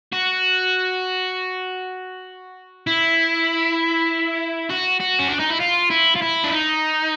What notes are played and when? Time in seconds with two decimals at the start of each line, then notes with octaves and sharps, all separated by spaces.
0.12 F#4
2.87 E4
4.70 F#4
5.00 F#4
5.20 C#4
5.30 D4
5.40 D#4
5.50 E4
5.60 F4
5.90 E4
6.15 F4
6.22 E4
6.44 D4
6.52 D#4